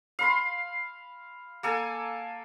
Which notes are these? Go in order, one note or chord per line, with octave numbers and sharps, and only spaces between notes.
F5 B5 C6
A#3 A4 G#5